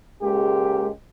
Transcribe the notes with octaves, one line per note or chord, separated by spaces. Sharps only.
C#2 G#3 A#3 G4